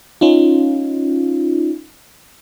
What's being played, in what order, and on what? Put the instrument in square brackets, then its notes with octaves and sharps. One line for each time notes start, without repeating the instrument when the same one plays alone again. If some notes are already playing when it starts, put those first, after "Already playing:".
[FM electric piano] C#4 D#4 F4